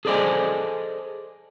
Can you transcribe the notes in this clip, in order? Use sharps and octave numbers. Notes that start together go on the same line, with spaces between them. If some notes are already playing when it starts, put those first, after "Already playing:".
G#4 A4 C5 D5 D#5 G#5